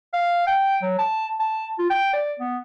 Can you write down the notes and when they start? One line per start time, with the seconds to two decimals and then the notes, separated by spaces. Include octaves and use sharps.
0.13 F5
0.47 G5
0.82 F#3
0.99 A5
1.40 A5
1.79 F4
1.90 G5
2.13 D5
2.39 B3